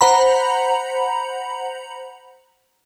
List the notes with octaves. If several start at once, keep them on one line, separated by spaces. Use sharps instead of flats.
C5 F#5 A#5 B5